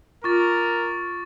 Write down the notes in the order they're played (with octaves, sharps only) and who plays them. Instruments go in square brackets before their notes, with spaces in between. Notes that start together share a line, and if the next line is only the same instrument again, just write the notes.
[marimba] F4 [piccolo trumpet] A#4 [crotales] C#6 D6 A6